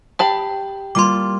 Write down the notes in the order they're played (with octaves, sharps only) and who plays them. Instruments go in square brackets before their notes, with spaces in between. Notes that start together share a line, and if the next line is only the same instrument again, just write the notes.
[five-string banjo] G4 A5 B5 [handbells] G5
[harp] G3 A#3 F4 [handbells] C6 D6